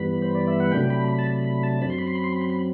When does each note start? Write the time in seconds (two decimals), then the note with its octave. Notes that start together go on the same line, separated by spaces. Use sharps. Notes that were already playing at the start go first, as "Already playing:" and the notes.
Already playing: G2 E3 G3 B3 B5
0.22 C5
0.35 D5
0.48 E5
0.60 F#5
0.72 C3 F#3 A3 D4 G5
0.90 B5
1.09 B5
1.19 A5
1.27 B5
1.44 B5
1.63 A5
1.81 F#2 F#3 C4 B5
1.90 C6
1.98 B5
2.07 C6
2.15 B5
2.24 C6
2.33 B5
2.41 C6
2.50 B5